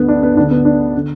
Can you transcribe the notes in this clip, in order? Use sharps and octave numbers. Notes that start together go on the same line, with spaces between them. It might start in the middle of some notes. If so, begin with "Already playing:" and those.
Already playing: D2 D3 B3
D4
B3
D2 D3 D4
B3
D4
D3